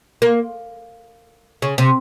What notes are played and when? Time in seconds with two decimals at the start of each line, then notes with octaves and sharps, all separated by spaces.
0.22 A#3
1.62 C#3
1.78 C3